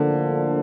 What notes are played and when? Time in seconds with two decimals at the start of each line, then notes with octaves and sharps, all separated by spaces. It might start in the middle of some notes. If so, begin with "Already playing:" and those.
Already playing: A2 D3 F3 A#3 D4